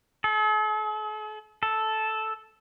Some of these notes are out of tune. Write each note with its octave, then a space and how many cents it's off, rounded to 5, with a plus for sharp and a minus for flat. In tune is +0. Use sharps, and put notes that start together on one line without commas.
A4 -45
A4 -5